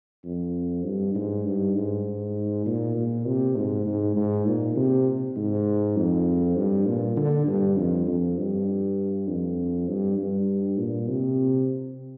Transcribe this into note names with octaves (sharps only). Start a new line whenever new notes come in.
F2
G2
G#2
G2
G#2
A#2
A#2
C3
G#2
G#2
G#2
A#2
C3
G#2
F2
G2
A#2
D3
G2
F2
F2
G2
F2
G2
G2
A#2
C3